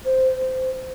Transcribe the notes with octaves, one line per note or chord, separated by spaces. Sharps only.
C5